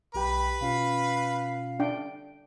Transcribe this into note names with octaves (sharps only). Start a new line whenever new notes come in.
B1 G4 B4 G5 B5
B2 C#4 F4 F5
D4 G5